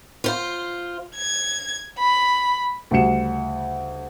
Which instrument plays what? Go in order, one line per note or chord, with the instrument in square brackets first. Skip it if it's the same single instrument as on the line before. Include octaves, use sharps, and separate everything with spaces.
[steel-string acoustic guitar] F4 C5
[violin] G#6
B5
[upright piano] D2 C#3 G3 F#5 C#7 E7